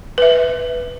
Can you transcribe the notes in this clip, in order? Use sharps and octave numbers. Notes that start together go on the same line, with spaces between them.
B4 E5